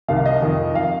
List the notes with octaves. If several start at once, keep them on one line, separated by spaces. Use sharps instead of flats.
C2 C3 D#3 F5
D#5
F2 D#3
D#3 F5